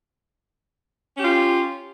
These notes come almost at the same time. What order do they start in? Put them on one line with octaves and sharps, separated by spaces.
C#4 G4 F4